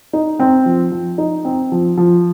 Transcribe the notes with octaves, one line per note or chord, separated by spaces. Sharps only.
D#4
C4
F3
F3
D#4
C4
F3
F3